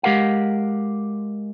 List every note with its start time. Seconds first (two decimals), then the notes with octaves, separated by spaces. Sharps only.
0.03 G#3 G4 A#4 F5 F#5